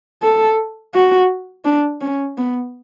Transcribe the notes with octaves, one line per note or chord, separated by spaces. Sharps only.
A4
F#4
D4
C#4
B3